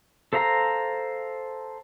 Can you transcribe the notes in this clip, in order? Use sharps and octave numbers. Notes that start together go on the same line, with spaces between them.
A4 C5 F5 A#5